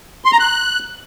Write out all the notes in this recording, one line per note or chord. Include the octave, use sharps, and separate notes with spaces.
C6
A#5
F#6